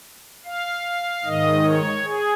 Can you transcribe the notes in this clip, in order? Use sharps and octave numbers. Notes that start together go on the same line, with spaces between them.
F5
G#2 D#3 D#5
C#5
G#4